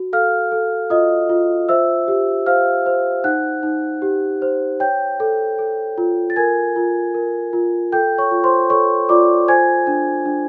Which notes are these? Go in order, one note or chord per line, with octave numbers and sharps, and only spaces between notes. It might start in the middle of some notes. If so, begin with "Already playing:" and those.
Already playing: F#4
A4 F5 F6
A4
F4 D#5 D#6
F4
C5 E5 E6
G4
C5 F5 F6
C5
D#4 F#5 F#6
D#4
G4
C5
C#5 G5 G6
A4
A4
F4
A6
A#4 G#5 G#6
F4
A#4
F4
A4 G5 G6
C#5 C#6
F4
C5 C6
A4 C#5 C#6
F4 D5 D6
C5 G#5 G#6
D4
D4